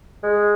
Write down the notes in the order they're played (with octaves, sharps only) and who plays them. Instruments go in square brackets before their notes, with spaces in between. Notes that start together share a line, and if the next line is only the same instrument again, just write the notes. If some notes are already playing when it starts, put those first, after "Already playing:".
[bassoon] G#3